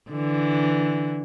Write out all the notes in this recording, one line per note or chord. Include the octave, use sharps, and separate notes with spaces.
D3 E3